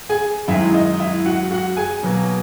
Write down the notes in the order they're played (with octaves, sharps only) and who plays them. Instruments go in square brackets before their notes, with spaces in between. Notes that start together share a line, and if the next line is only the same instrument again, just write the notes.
[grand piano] G#4 G#5
F#2 D#3 G#3 E4 E5
D#5
E4 E5
F#4 F#5
F#4 F#5
G#4 G#5
B2 F#3 A#3